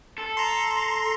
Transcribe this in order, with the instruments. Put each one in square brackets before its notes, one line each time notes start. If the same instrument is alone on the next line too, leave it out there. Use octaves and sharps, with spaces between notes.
[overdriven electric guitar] A4
[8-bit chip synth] A#5 C6